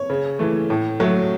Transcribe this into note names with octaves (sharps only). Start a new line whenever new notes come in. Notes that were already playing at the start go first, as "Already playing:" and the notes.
Already playing: C#5
C#3
E3 A3
A2
F#3 A3